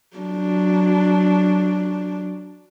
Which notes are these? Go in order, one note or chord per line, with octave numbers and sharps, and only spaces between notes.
F#3 D4